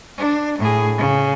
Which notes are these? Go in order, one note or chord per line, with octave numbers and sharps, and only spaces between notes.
D4
A2 G#4
C#3